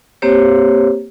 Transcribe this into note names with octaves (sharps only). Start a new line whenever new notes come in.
A#3 C4 G4 C5 C#5